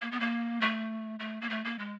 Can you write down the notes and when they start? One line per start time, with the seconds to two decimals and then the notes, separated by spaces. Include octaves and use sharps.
0.02 A#3
0.11 B3
0.20 A#3
0.61 A3
1.19 A3
1.41 A#3
1.50 A3
1.64 A#3
1.79 G#3